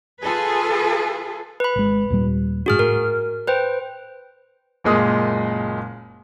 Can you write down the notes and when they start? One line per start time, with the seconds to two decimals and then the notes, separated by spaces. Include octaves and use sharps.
0.22 F4 G#4 A4 B4
1.60 B4 B5
1.76 G#1 G#3
2.10 D#2 A#2 G3
2.66 G#2 D4 F#4 G#4 F6
2.79 A2 A#4
3.47 B4 C5 G5
4.84 F#1 A#2 G#3 D#6